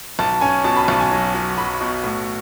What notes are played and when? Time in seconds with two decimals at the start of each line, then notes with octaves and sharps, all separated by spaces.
0.19 B1 A5
0.41 C#4 G#5
0.64 B2 A5
0.77 B5
0.88 B1 A5
1.00 G#5
1.11 F#3
1.34 F#3
1.57 F#3 B5
1.81 B2
2.04 A2